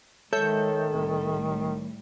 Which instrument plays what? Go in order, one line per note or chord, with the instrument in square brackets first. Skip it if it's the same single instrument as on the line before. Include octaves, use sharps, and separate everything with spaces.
[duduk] D#3 [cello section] G#3 [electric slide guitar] A4 [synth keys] C#5 E5 G6
[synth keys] C2 [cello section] A2 G3